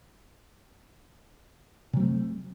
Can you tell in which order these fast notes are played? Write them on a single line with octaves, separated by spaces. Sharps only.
C3 F#3 A3 C4